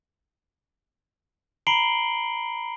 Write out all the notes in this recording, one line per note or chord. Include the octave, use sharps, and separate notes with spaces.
A#5 B5 C7 D7 F#7 G7